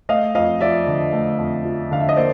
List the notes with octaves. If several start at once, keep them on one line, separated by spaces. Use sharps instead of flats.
A3 D#5 F5
F2 D#5 F5
F3 D5 E5
D3
A3
F2
F3
D3 F5
E5
D#5
A#3 C5 D5